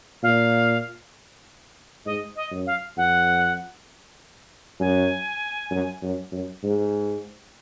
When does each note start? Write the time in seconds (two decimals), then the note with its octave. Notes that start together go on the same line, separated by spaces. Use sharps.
0.23 A#2 F5
2.05 G#2 D#5
2.36 D#5
2.51 F#2
2.66 F5
2.97 F2 F#5
4.80 F#2 G#5
5.71 F#2
6.02 F#2
6.32 F#2
6.63 G#2